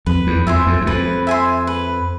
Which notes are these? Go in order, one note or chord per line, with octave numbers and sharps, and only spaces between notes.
F2 B4
E2
F2 E5 G#5 C6
F2
E2
F2 B4
E5 G#5 C6
B4